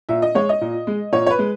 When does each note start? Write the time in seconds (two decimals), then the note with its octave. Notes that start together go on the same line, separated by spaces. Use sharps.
0.09 A#2 E5
0.22 D#5
0.35 G#3 C#5
0.49 D#5
0.61 A#2
0.87 G#3
1.12 A#2 C#5
1.27 C#5
1.30 B4
1.39 G#3